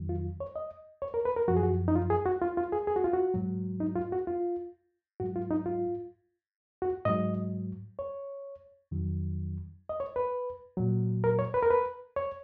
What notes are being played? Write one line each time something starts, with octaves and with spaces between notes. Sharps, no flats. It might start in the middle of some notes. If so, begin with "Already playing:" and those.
Already playing: F2 D#3 F#3
F4
C#5
D#5
C#5
A#4
B4
A#4
F#2 F3 F#4
G#4
F#4
D#4
F4
G#4
F#4
F4
F4
G#4
G#4
F#4
F4
F#4
G#2 F#3
D#4
F4
F#4
F4
G#2 F#3 F#4
F4
D#4
F4
F#4
G#2 F#3 D#5
C#5
F2 D#3 F#3
D#5
C#5
B4
A#2 F#3
A#4
C#5
B4
A#4
B4
C#5